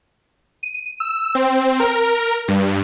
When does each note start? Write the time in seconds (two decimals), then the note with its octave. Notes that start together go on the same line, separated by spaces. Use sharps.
0.63 D#7
1.00 E6
1.35 C4
1.80 A#4
2.48 G2